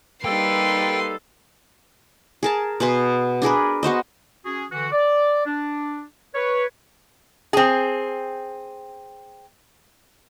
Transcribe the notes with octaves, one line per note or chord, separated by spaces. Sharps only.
G3 A#3 D#4 G4 A4 B4 G5 C6
G#4 A#4 A5
B2 G#4 B4 C6
D4 G#4 A#4 B4
B3 F#4 C5 D#5
C#4 F#4 G#4
D3 E3 F#4
D5
D4
B4 C#5
C4 G#4